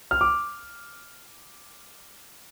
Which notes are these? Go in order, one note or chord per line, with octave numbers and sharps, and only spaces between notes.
F6
D6